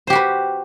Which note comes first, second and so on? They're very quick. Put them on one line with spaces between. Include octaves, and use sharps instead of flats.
C5 G4 F#4 B4